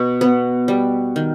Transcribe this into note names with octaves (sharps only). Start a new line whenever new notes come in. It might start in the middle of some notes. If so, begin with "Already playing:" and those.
Already playing: B2 B4
B3
G3
D#3